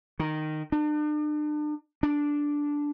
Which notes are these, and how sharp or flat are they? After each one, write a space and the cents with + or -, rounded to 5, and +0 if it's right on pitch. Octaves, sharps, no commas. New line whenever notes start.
D#3 -10
D4 +40
D4 -5